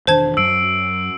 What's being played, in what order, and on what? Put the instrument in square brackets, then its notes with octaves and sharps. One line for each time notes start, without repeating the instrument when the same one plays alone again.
[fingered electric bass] E1 D#3 D4 [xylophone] C5 A5 G#6
[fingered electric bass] F#2 F#3 [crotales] E6 C7 D7